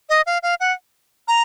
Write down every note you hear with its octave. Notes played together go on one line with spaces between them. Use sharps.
D#5
F5
F5
F#5
A#5